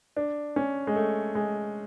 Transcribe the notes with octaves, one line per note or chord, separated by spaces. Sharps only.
D4
C#4
G#3
A3
G#3